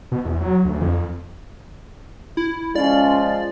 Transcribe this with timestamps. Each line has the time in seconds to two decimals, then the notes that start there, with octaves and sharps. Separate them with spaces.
0.12 B2
0.25 E2
0.41 F#3
0.65 D2
0.81 F2
2.37 E4
2.75 F3 G#3 C#4 F4 D5